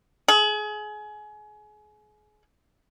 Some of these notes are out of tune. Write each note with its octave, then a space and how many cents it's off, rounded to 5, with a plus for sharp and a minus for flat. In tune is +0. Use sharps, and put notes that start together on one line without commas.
G#4 +30